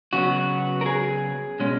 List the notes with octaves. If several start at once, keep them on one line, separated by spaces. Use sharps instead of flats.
C#3 F#3 B3 F#4
A#4
G#4
B2 G#3 C#4